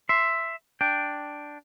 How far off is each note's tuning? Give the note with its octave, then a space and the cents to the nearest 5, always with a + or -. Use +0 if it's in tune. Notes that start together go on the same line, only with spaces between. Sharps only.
E5 +5 C6 +0
D4 +0 G5 +0